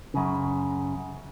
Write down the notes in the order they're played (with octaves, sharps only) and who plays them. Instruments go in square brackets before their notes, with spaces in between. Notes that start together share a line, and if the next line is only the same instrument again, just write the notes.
[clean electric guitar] F#2 C#3